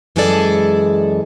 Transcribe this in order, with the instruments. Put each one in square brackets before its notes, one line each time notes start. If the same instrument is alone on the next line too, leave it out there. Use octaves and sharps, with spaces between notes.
[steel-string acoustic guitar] F#2 E3 G#3 G#4 A4 D5